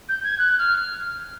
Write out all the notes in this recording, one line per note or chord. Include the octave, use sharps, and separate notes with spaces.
G6
G#6
F#6
F6